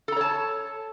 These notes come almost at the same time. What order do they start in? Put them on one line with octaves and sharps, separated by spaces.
A4 A#5 C#5 A5